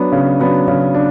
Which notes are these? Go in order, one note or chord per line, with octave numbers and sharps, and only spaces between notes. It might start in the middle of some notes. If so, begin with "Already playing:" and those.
Already playing: F#3 B3 D4
C#3
F#3 B3 D4
C#3
D4